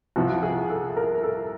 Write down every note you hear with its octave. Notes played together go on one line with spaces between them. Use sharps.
C2 C3 F3 F#4
G#4
A4
A#4
A4